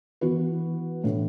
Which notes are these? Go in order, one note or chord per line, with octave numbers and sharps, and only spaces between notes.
E3 B3 F#4 B4
A2 E3 A3 D4